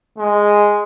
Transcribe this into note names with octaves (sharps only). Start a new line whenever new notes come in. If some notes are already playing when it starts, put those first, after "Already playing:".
G#3